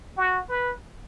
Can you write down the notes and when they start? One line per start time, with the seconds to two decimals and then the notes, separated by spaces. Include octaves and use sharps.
0.18 F#4
0.49 B4